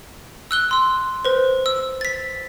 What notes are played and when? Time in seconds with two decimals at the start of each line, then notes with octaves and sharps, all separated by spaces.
0.51 E6 F#6 G7
0.71 C6 E6
1.25 B4 C5
1.66 E6
2.01 A6 B6